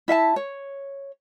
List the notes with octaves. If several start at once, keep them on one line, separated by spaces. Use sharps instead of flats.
E4 E5 F5 A5
C#5